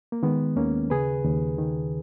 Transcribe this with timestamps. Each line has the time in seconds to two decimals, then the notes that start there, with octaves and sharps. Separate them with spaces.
0.12 A#3
0.23 D#3 G#3 B3
0.56 D#2 A#3 C#4
0.90 C#3 G#4 B4
1.25 D#2
1.58 D#3